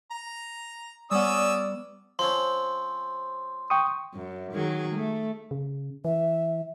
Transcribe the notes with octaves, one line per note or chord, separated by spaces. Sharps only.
A#5
G3 B3 C#4 D5 D#6 E6
F3 C4 C#4 C6
G5 C#6 D#6
F#2
D#3 F#3 G#4
A3
C#3
E3 E5